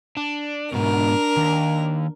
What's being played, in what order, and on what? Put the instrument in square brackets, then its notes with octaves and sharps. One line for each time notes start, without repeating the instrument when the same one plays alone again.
[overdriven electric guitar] D4
[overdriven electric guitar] G#2 B2 [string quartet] D4 A#4
[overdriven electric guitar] D#2